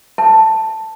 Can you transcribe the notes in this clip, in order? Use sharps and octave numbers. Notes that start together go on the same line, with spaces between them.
A5